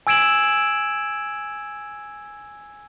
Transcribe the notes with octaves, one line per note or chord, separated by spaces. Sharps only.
G#5 E6 G#6 D7 E7 F#7